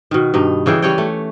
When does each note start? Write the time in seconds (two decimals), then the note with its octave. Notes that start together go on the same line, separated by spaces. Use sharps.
0.11 B2 D#3
0.34 G2 B2 D#4
0.66 C#3 E3 G#4 G5
0.82 G3 C#4 C#5 G5
0.98 A3